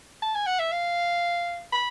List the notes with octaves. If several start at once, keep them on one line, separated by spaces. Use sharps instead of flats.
A5
G#5
F#5
E5
F5
B5